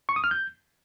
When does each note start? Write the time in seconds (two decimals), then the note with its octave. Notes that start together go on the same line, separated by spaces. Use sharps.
0.09 C#6
0.16 D#6
0.24 F6
0.31 G6